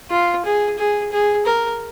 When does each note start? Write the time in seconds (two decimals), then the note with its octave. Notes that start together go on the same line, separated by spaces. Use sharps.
0.11 F4
0.45 G#4
0.78 G#4
1.12 G#4
1.45 A#4